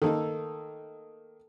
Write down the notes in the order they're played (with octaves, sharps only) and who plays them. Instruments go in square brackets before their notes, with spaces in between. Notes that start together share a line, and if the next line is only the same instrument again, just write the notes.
[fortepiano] D#3 A#3 D#4 [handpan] A4